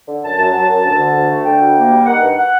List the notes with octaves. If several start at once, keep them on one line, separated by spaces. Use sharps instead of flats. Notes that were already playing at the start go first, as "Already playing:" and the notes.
D3
F#2 A5
F#2
F#3
F#2
D2
D3
D2
A3
D3 G5
D2
A#3
G3
D#3 F#5
G2
F#5